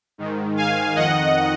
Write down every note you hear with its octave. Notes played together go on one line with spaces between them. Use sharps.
G#2 D#3
F5 G#5
F2 D#3 D#5 F#5